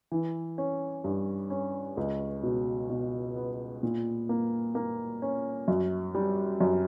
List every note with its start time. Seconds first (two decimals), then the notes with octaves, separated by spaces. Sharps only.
0.12 E3
0.58 C#4
1.04 G2
1.50 C#4
1.97 C#2
2.43 B2
2.90 B2
3.36 B3
3.83 A#2
4.29 A#3
4.75 A#3
5.22 C#4
5.68 F#2
6.15 G3
6.61 F#2